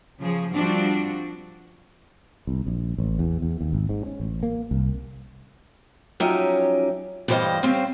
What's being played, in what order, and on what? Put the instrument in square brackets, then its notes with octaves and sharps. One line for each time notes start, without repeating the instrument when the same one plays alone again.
[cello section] C#3 F3 G#4
F3 G3 C4 D4 F#4
[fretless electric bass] C2
A#1
A1
E2
E2
D#2
G#1
G#2
C#4
A1
A#3
C2
[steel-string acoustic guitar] F3 F#3 C#4 D#4 G4 E5
G2 E3 G3 C5 D#5 F5
G3 C4 C#4 C5 F5